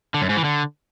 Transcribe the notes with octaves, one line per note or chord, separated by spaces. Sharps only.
D3
F#2
G#2
E3
D3